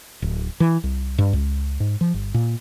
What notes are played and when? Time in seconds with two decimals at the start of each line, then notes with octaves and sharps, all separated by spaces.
0.22 D1
0.60 E3
0.84 C2
1.18 G2
1.33 C#2
1.80 G#2
2.01 F3
2.14 G1
2.34 A#2